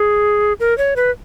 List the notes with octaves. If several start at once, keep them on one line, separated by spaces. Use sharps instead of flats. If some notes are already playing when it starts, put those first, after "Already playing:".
Already playing: G#4
A#4
C#5
B4